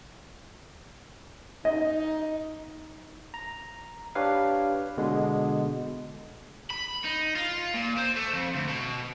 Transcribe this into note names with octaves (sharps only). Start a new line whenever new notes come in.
D#4 D#5
A#5
D4 G4 B4 C#5 F5
B2 D3 G#3
B5
D#4
F4
A#2
C4
A3
F2
D2
B2